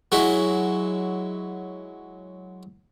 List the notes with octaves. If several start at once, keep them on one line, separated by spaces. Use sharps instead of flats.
F#3 G#3 E4